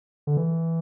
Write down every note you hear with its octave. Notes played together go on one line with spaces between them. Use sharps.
D3
E3